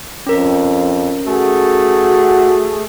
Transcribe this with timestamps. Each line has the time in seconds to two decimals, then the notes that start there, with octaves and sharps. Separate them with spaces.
0.27 F2 C#4 A#4
1.27 A3 F#4 G#4